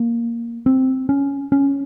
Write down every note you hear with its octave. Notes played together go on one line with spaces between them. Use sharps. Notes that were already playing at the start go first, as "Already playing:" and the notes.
Already playing: A#3
C4
C#4
C#4